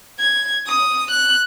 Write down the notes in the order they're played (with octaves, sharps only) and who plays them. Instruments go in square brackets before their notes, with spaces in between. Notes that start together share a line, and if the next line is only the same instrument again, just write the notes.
[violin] G#6
D#6
F#6